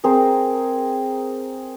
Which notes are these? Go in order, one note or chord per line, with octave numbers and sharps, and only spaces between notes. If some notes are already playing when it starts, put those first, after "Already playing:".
C4 G#4 A#4